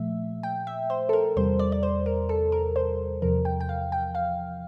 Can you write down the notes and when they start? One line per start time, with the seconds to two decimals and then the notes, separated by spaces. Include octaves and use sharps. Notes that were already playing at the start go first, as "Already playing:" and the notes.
Already playing: A#2 F3 A3 E5
0.43 G5
0.67 E5
0.90 C5
1.09 A4
1.13 A#4
1.36 E2 C3 G3 C5
1.59 D5
1.72 D5
1.83 C5
2.06 A#4
2.29 A4
2.52 A#4
2.76 C5
3.22 E2 C3 F3 A#4
3.45 G5
3.61 G5
3.69 F5
3.92 G5
4.15 F5